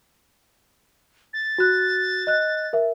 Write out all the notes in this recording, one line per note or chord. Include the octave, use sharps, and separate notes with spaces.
A6
F#4 F#6
D#5 F#6
A#4 E5